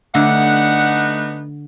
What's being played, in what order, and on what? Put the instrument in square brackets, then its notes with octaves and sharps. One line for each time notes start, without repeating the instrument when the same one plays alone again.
[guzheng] D3 [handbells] A3 [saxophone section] B3 D4 D#4 [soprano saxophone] F#5